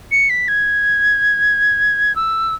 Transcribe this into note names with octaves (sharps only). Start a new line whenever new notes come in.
C#7
B6
G#6
E6